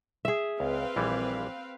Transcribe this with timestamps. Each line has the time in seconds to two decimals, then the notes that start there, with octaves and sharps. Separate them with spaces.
0.25 G#4 E5
0.60 C#2 C4 B4 F5
0.96 A#1 E3 G3